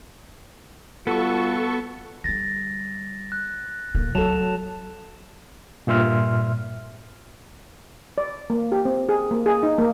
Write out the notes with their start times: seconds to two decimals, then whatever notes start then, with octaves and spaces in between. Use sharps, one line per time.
1.07 G3 B3 F4 F#4 A4 C#6
2.24 D3 G3 A6 A#6
3.32 F#6
3.95 D1 A#3
4.15 C#2 F#3 C#4 A4 A5 E7 F7
5.87 G2 A#2 E5 C6 F6
8.18 D5
8.50 A#3
8.72 G4
8.85 C4
9.09 G#4
9.31 A#3
9.46 G#4
9.63 D#4
9.78 A#3